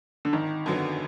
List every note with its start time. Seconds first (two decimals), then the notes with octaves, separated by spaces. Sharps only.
0.25 D3
0.33 G#1 D#3
0.66 F#2 D3 F#3 B3